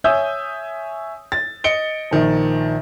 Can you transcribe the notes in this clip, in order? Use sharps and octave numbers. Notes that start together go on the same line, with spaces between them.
C#5 E5 G#5 D#6 E6 G6
A6
D#5 C#7 D7 G7
A#1 D#3 F3